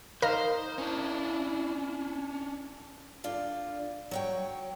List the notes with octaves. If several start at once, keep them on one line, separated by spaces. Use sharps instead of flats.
D#4 A#4 C5 D#5 F5 A#5
C#4 D4 E4
D3 F4 D5
F#3 C#5 G5